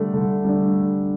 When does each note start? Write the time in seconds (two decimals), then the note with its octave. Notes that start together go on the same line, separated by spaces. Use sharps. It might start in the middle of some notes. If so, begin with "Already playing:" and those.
Already playing: D3 G3 A3 D4
0.14 D3
0.44 G3 D4